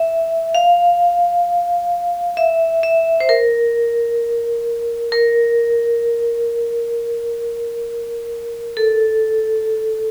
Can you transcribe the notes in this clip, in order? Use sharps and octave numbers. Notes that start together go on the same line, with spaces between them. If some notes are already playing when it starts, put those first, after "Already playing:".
Already playing: E5
F5
E5
E5
C5
A#4
A#4
A4